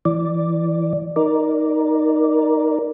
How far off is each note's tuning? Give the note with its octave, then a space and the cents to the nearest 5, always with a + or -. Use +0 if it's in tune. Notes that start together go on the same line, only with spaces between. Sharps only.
E3 +10 D5 +0
D#4 +0 A#4 +10 D5 +0